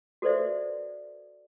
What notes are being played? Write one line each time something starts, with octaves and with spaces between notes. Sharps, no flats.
F#4 A4 B4 C5 D5 E5